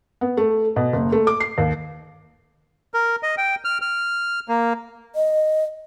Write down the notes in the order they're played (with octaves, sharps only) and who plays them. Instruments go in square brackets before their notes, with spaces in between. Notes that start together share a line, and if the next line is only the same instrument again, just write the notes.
[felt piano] B3
A3
B2
F#1
A3
D6
C7
D#2
[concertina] A#4
D#5
G5
F6
F6
A#3
[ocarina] D#5